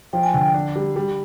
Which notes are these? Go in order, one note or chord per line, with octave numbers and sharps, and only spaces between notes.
F3 G5
G#5
D3 G5
D4
G3
G3